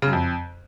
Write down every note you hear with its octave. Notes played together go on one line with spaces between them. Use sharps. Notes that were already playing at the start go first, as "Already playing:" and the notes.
C#3
F#2
F2